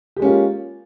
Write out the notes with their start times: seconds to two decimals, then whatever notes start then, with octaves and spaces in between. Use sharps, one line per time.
0.16 G4
0.19 G#3
0.22 C#4
0.25 A#3
0.28 F4